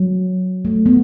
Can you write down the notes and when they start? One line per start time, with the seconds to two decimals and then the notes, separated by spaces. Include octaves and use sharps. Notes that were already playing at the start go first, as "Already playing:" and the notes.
Already playing: F#3
0.65 A3
0.86 B3